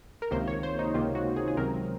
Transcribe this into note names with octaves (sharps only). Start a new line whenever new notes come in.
A#4
C#2 C3 D#3 A#3 C5
C#5
C5
D#4
C#2 C3 D#3 A#3 F4
F#4
G#4
G#4
C#2 C3 D#3 F#3 C4 A#4